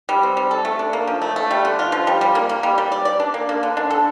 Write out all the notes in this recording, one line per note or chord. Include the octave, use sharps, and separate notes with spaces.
G3
C4
G3
A4
A3
D4
A#3
F3
A3
A3
G3
D3
F4
F3
G3
G3
A#3
A#3
G3
G3
D5
D5
D4
A#3
A#3
D3
D4
A4